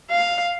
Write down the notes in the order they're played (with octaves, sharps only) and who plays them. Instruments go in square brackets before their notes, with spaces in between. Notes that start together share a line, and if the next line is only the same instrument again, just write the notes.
[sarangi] F5